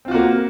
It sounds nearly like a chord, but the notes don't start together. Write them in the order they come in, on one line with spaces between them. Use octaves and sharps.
C4 F4 F#4 A#3